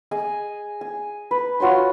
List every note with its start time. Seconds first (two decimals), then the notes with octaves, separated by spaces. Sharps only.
0.11 G#4 D#5 G#5
0.81 G#5
1.31 B4
1.60 F4 F#4 C#5 C6